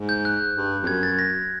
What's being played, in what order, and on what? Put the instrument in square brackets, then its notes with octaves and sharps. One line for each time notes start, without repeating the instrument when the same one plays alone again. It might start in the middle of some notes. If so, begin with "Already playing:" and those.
Already playing: [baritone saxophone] G#2
[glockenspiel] G6
F#6
[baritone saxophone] G2
F2
[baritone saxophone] F#2 [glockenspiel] G#6
[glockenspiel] A6
A#6